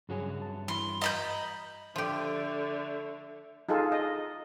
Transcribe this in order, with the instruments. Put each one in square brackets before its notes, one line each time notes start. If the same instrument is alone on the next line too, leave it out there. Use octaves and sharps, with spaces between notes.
[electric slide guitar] G2 F#4 C#5 [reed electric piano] C#3 F#3 G#4
[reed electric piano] A5
[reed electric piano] E3 B5 [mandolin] C6
[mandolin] D#5 B5 G6 [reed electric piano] A#5
[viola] D3 [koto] F3 G4 [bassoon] A3
[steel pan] D#4 F4 G#4 A4
D#5